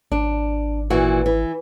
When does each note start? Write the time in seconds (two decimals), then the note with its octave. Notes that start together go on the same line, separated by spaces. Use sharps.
0.12 G#1 D4
0.90 A#2 E3 F#4
1.26 E3